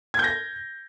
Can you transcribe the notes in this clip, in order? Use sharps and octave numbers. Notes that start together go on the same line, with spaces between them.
G6 G#6 A#6